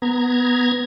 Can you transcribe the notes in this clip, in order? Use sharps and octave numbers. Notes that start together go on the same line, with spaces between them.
B3 A#5 G#6